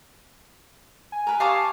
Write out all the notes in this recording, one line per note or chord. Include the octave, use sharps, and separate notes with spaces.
G#5
A#4 B4
G4 F5 A5 C#6 D#6 F6